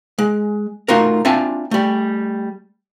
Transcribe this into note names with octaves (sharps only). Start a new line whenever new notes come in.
G#3
A3 D#4 F4 F#4 A#4
C4 D4 F4 E5 G#5 A5
G3 A3